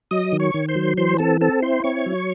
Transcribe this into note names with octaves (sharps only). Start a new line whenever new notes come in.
F#3 D#5 D#6
D#3
C#5 C#6
D#3
C5 C6
F#3
E3 C5 C6
C4 A4 A5
C4 A4 A5
E4 C5 C6
C4 C#5 C#6
F#3